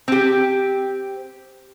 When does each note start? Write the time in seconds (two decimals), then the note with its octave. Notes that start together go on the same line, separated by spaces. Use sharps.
0.08 C4 G4